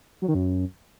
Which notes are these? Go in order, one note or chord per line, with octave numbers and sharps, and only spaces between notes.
F#3
D#3
F#2